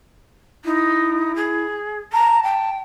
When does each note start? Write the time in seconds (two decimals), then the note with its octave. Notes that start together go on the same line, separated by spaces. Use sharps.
0.65 D#4 E4
1.36 G#4
2.13 A5 A#5
2.43 G5